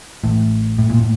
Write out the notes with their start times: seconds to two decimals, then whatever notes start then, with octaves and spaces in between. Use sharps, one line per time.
0.24 A1 A2
0.78 A2
0.90 A#2
1.01 A2